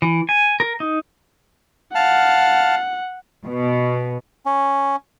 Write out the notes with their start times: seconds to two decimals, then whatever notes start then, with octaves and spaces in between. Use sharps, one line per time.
0.02 E3
0.29 G#5
0.60 A#4
0.80 D#4
1.95 F5 F#5 A5 F6
3.45 B2
4.46 C#4